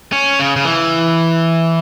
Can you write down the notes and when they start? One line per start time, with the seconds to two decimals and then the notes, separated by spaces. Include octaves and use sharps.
0.12 C#4
0.39 C#3
0.56 C#3
0.65 E3